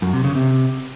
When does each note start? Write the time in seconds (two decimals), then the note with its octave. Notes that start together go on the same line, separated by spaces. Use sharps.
0.02 F#2
0.13 C3
0.24 C#3
0.35 C3